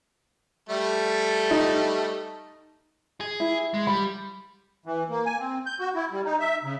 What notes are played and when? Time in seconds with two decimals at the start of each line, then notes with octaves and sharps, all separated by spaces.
0.69 G3 A3 A4
1.51 D#4
3.21 G#4
3.40 E4
3.74 G#3
3.87 G3 B5
4.86 E3
5.10 A#3
5.25 G#5
5.39 C4
5.66 G6
5.80 F#4
5.95 E4
6.11 G3
6.25 D#4
6.40 E5
6.63 C#3